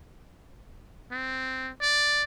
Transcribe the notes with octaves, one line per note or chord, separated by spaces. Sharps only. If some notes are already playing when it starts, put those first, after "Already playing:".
C4
D5